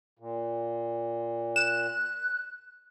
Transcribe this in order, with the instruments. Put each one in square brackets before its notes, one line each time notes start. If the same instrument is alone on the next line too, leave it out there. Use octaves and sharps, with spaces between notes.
[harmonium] A#2
[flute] F#6 [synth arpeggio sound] E7